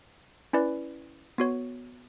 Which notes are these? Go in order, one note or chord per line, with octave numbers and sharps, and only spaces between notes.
C#4 E4 B4 D5
B3 F#4 C#5